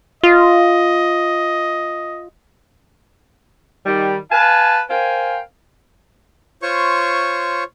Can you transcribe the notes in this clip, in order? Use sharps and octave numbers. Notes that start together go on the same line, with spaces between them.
F4 D#5
D#3 G3
B4 F5 G#5 A5
A#4 C5 F5 G5 G#5
F4 C5 C#5 C#6